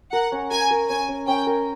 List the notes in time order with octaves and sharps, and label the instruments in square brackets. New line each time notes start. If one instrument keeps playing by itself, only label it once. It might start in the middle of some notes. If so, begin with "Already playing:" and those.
[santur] A#4 [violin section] F#5
[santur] C#4
[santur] A#4 [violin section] G#5
[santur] A#4
[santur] C#4 [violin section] G#5
[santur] C#4
[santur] C#4 [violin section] G5
[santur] A#4